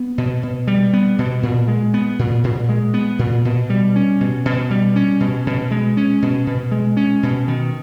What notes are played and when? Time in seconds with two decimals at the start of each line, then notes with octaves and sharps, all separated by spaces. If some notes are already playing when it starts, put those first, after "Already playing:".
Already playing: B3
0.18 B2
0.43 B2
0.68 G3
0.93 B3
1.19 B2
1.43 A#2
1.68 G#3
1.94 B3
2.19 A#2
2.44 A#2
2.69 G#3
2.94 B3
3.19 A#2
3.45 B2
3.70 G3
3.96 C#4
4.21 B2
4.45 B2
4.71 G3
4.96 C#4
5.20 B2
5.47 B2
5.71 G#3
5.97 C#4
6.22 B2
6.47 B2
6.71 G#3
6.97 C#4
7.23 B2
7.48 D#3